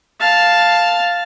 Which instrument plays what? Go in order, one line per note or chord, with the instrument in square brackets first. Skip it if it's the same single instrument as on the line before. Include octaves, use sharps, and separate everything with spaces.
[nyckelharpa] F5 A5